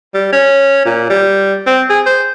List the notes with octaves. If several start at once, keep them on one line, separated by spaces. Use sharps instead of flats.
G3
C#4
A#2
G3
C4
G#4
C5